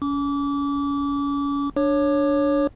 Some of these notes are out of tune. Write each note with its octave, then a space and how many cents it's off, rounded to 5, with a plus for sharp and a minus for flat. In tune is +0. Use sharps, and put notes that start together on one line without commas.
C#4 +30 D6 -30
D4 +0 C#5 +0 D6 +25